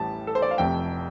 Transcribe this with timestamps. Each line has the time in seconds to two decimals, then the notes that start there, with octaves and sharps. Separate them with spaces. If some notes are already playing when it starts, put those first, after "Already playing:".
Already playing: A1 A2 G3 A5
0.27 A4
0.35 C5
0.42 D5
0.51 F5
0.58 F1 F2 C3 A3 G5